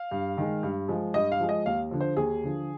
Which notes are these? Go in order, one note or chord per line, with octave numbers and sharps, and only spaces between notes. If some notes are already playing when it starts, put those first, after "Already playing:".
Already playing: F5
G2
D#3 G#3
G2
F3 G#3
G2 D#5
F5
F3 G#3
D#5
D#2 F5
D3 F3
C5
D#2 G#4
D3 F3